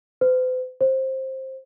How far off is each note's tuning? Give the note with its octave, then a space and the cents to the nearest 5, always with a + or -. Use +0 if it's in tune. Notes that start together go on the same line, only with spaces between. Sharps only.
C5 -45
C5 +15